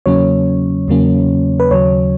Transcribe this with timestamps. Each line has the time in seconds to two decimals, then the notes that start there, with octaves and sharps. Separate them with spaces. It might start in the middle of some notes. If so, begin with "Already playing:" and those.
0.06 E2 C#3 F#3 A#3 C#4 C#5
0.88 E2 C#3 F#3 A#3 C#4
1.60 B4
1.71 D#2 C#3 F#3 C#5